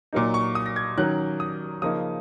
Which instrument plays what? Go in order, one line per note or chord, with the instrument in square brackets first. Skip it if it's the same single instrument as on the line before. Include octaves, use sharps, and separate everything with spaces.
[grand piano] A#2 F#3 A#3 D#4
C#6
D#6
A#6
G#6
D#3 F#3 C#4 F#6
D#6
C#3 F3 A#3 D#4 D#6